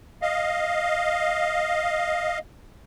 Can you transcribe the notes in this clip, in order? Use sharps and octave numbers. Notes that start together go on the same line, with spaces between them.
D#5 F5